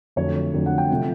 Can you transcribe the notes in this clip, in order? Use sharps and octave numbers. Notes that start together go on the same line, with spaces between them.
F2 D3 F#3 A3 C#5
F2 D3 F#3 A3
F#5
G5
C3 F3 A3